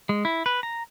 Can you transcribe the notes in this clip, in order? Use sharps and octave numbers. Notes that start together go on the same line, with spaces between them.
G#3
E4
B4
A#5